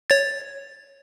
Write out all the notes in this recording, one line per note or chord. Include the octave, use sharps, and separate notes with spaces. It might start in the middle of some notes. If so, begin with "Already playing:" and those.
C#5 A6